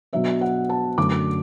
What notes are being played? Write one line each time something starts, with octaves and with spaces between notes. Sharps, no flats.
B2 F#3 D4 E5
F#5
A5
F#2 D3 A3 D4 D6